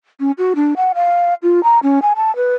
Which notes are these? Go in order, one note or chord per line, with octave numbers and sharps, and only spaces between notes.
C#4
F#4
D4
F#5
F5
F4
A#5
C#4
G#5
A5
B4